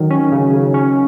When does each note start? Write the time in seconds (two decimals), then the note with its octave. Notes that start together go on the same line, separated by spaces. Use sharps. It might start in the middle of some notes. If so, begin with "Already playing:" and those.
Already playing: D#3 F#3
0.11 C#4
0.32 C#3
0.53 C#3
0.74 C#4